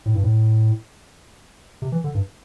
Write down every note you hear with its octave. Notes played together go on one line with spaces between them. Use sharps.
A2
G2
A2
C3
E3
D3
G2